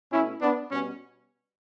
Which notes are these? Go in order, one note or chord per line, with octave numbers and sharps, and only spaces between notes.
B2 A3 C#4 E4
B3 D4
B2 G3 B3 C#4